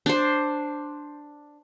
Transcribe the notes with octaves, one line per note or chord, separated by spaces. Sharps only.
D4 C5